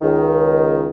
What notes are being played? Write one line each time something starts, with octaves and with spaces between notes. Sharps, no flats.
C#2 D#3